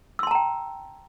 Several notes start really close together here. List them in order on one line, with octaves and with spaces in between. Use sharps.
E6 C6 A5 A#5 G5